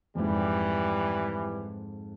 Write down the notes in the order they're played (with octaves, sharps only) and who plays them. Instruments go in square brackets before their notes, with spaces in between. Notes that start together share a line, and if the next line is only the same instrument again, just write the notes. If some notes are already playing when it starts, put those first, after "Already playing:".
[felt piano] F2 G#2 [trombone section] E3 G3